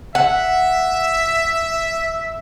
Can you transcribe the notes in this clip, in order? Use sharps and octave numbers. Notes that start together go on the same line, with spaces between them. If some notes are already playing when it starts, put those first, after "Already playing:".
E5 F#5